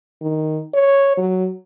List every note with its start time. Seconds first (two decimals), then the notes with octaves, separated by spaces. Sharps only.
0.22 D#3
0.74 C#5
1.17 F#3